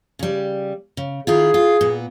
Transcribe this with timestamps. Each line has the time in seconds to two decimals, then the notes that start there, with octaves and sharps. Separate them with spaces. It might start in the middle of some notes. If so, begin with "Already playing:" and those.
0.19 C#3 G3
0.97 C#3
1.27 D#3 E4 F4 G#4
1.54 F4
1.81 A#2 B3